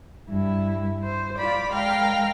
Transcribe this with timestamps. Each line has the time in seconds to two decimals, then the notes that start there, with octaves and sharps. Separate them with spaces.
0.29 G2 E4
1.03 C5
1.38 F4 D5 B5
1.72 G#3 A#4 F5 G5 F6